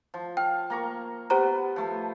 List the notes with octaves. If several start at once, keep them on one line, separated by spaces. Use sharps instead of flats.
F3
F5 G5
A#3 A#5 C#6
B3 G4 C5 A#5
F3 A3